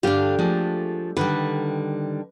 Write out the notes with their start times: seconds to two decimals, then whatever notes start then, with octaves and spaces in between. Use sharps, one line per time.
0.03 G2 D3 D4 G4 F5
0.39 F3 G#3 A3
1.17 D3 D#3 G3 B4